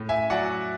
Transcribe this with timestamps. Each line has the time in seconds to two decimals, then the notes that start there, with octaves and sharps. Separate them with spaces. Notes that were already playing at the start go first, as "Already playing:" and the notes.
Already playing: A2
0.09 E5 G#5
0.30 F#3 D5 F#5